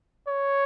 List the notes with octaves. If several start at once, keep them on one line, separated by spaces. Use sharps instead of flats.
C#5